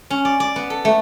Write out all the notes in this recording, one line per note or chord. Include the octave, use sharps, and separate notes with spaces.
C#4
D5
D5
B3
A4
A3